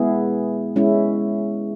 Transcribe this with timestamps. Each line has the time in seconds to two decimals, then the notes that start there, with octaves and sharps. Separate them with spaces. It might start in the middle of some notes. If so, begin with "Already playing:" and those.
Already playing: G#3 B3 E4 G#4
0.76 G#3 C#4 E4